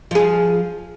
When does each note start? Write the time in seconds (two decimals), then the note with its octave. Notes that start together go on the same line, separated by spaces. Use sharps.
0.11 F3
0.15 G#4
0.19 F4